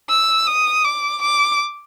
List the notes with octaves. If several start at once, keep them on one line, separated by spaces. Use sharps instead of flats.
E6
D#6
D6
D6